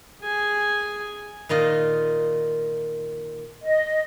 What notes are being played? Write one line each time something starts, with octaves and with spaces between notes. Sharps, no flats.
G#4 G#5
A#2 D#3 F4 D#5
D#5